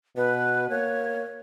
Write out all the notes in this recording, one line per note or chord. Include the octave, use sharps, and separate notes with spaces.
B2 B4
A#3 C#5